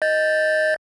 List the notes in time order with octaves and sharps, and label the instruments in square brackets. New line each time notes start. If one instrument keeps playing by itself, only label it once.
[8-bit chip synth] D#5 G6 A6